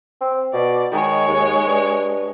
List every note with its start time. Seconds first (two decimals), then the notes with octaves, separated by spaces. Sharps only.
0.21 C4
0.53 B2 D5
0.92 D#3 G#3 C#5
1.27 D#2
1.67 G2